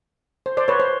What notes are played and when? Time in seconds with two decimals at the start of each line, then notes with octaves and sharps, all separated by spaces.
0.46 C5
0.57 C5 D5
0.68 B4 C#5
0.80 C5